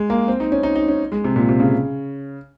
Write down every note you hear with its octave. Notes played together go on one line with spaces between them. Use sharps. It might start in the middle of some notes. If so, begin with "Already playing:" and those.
Already playing: G#3
A#3
C4
D#4
C#4
D#4
D#4
C#4
G#3
C3
A#2
C3
C#3